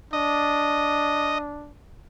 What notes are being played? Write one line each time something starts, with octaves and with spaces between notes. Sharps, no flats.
D4 D#5